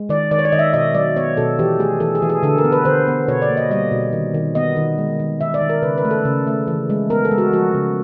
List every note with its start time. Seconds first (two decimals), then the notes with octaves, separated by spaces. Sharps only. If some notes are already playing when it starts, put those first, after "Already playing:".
Already playing: G#3
0.09 D#3 D5
0.31 D#3 D5
0.39 C#5
0.45 D5
0.52 D#3 D#5
0.59 E5
0.74 B2 D#5
0.94 F#3 D5
1.16 B3 C#5
1.37 B2 A4
1.59 E3 G4
1.79 A3 G#4
2.00 E3 A4
2.15 G#4
2.22 E3
2.30 G#4
2.43 D3 A4
2.58 A#4
2.64 B3
2.72 B4
2.85 D3 C5
3.08 B3
3.28 B2 C#5
3.42 D5
3.50 A#3
3.57 D#5
3.70 G3 D#5
3.91 B2
4.13 D#3
4.34 D#3
4.55 B3 D#5
4.77 D#3
4.98 G#3
5.20 D#3
5.41 D#3 E5
5.54 D5
5.61 D#3
5.69 A#4
5.82 C#3 B4
5.98 B4
6.05 A3
6.11 A4
6.25 C#3
6.47 A3
6.67 E3
6.90 G#3
7.10 B3 A#4
7.25 A4
7.31 G#3
7.38 F#4
7.53 F3 F#4
7.74 C#3